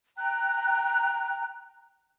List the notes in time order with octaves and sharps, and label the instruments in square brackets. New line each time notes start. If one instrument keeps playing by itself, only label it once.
[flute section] G5 A#5 F#6